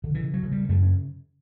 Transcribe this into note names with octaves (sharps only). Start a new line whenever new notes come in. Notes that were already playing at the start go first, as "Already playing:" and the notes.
D3
C#3 E3
F#3
C#3
G3
F#2 A3
C#4